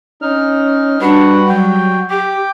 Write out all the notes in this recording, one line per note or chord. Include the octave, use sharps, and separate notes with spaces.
C#4 D#4 F6
G3 D4 F#4 B4 F#5
F#3 F#4 G5
G4 G5 D6